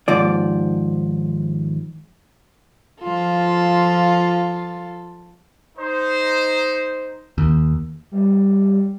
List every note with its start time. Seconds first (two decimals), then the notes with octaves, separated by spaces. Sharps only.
0.08 D#2 G#2 F3 D5
3.01 F3 F4 A4
5.77 D#4 C5
7.38 D#2
8.11 G3